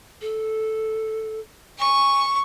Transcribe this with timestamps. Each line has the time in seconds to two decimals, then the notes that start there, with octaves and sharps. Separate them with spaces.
0.21 A4
1.79 G#5 C#6